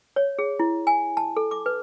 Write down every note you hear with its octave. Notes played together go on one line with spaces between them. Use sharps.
C#5
G#4
E4
G#5
A5
A4
D6
B4